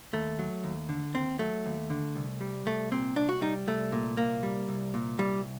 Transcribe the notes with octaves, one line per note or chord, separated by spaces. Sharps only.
D#2 A3
F#3
D#2
D3
D#2 C4
F#3 A3
D#2
D3
C2
G3
C2 A3
A#2 C4
C2 D4
F#4
G3 D#4
C2 A3
A#2
C2 A#3
G3
C2
A#2
C2 G3